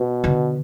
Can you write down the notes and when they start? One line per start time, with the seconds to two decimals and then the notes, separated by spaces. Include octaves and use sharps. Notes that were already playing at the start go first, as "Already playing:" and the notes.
Already playing: B2
0.24 D3